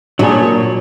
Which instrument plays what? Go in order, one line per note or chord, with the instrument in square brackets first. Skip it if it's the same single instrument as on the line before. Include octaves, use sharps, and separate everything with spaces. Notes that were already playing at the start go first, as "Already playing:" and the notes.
[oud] A#2 [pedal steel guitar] F#3 C#5 [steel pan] D4 G#4